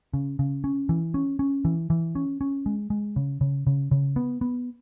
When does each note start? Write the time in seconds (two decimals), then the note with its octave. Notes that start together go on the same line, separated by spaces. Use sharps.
0.13 C#3
0.39 C#3
0.64 C#4
0.89 E3
1.14 C#4
1.39 C#4
1.65 E3
1.90 E3
2.15 C#4
2.41 C#4
2.66 G#3
2.90 G#3
3.16 C#3
3.41 C#3
3.67 C#3
3.91 C#3
4.16 B3
4.41 B3